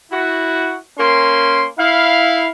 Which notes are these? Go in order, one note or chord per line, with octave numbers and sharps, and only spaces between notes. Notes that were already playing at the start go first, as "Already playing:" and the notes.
E4 F#4
A#3 C#4 A#4 C6
E4 F5